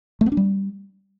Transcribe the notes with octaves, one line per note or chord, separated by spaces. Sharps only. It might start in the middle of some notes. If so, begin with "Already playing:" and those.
A3
B3
D4
G3